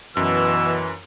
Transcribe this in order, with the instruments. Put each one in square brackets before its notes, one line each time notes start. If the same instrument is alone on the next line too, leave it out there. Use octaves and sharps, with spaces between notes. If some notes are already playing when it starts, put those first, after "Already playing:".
[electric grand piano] F#2 [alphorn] B2 [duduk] E3 [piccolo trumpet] E6